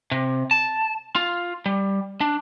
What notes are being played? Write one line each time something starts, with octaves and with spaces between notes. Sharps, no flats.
C3
A5
F4
G3
D4